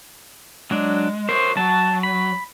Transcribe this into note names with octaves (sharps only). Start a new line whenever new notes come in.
F#3 G#3 D4
A#4 C5 C#5
F#3 A5
B5